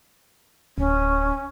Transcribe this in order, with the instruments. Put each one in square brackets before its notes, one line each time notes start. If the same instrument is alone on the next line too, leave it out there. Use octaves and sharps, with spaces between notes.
[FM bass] D1 [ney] C#4